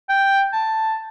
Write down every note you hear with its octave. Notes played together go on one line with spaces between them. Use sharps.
G5
A5